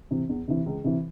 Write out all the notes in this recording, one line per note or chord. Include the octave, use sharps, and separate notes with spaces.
C3 E3
E2
C3 E3
C#2
C3 E3